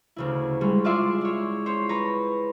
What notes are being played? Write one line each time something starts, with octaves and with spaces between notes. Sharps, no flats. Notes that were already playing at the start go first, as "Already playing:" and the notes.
D2 C#3 E4
G3 G#3 C#5
F4 G#4 D5 E5 C6
E4 C#5
C5 C#5
B4 C#5 A#5